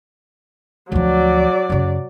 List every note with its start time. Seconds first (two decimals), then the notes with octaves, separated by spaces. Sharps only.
0.92 D2 F3 F#3 D5
1.70 F#2 C#3